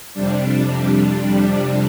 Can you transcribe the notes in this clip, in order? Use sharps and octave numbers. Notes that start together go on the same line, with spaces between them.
F2 C3 G3 D4